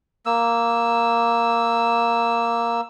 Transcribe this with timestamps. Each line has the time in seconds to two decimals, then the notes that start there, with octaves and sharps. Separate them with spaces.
0.26 A#3 E6